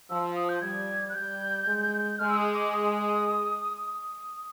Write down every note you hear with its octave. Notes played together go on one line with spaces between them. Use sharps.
F3 E6
D#6
G6
G3 G#6
F#6
G3 G6
G#3
G#3 F6
E6
D#6
D6
D#6
D#6